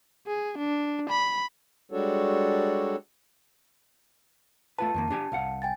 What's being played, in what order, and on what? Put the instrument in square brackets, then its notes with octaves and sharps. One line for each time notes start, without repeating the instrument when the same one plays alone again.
[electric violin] G#4
D4
B5
[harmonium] G3 G#3 D4 F#4 A4 C#5
[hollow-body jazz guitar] A3 F4 B4 [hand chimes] A5
[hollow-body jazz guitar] F2 D#3 A#3
D4 G4 G#5
C2 F5 F#5
[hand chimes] G5 G#5 A6